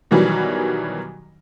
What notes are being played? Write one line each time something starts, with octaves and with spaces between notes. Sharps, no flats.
B2 D#3 E3 F#3 G3